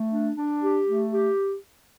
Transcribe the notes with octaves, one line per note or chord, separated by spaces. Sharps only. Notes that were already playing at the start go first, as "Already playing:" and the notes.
Already playing: A3
D4
D4
G4
A3
G4